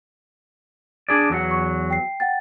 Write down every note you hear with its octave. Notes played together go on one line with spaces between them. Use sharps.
D4 G#4 D5
E2 F#3 F#5
C#6
G5 C7
F#5 G5 A6